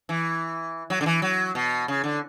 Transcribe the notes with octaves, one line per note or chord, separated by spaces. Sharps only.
E3
F#3
D3
E3
F#3
B2
C#3
D3